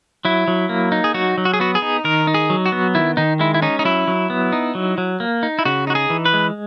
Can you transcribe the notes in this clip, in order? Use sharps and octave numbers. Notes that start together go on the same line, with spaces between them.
F#3 E4
F#3
A#3
D#4
G#4
F#3 F#4
F#3
F#4
G#4
B3 F#4
G#4
D#4
D#3 A#4
D#4
G#4
F#3
F#4
B3
D#3 E4
D#3 D#4
G#3 E4
E4
C#4 D#4
D#4
F#3 E4
F#3
B3
D#4
F#3
F#3
A#3
D#4
E4
C#3 F#4
D#4 F#4
G#4
E3
B4
G#3